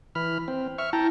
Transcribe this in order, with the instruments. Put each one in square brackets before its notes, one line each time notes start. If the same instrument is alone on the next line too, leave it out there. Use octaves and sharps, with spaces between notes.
[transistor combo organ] E3 B5 F6
C4
E5 C#6 F6
[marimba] E4 [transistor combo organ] G5 A5 A#5